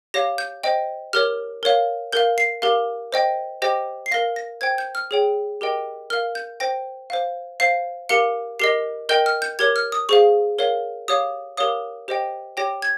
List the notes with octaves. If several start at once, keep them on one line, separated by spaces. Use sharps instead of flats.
G4 C#5 F5 A#6
G6
C5 D#5 G5
G4 A#4 C#5 F6
A#4 C#5 F5
A#4 F5 G6
C7
G4 A#4 F5
C5 D#5 G5
G4 C5 D#5 G5 A#6
C7
A#4 F5 A#6
A#6
C5 G5 G#6
G6
F6
G#4 C#5 G5
G4 A#4 D#5 G5
A#4 F5 F6
G6
C5 G5 A#6
C5 F5
C5 F5 C7
G4 A#4 F5 C#7
G4 A#4 D#5 C7
A#4 D#5 G5 G6
F6
G6
G4 A#4 C#5 G#6
F6
D#6
G#4 C5 F5 C#6
A#4 C#5 F5
G4 C#5 F5 D#6
G4 A#4 C#5 F5 D#6
G4 C5 D#5 G5
G4 C#5 G5 A#6
G#6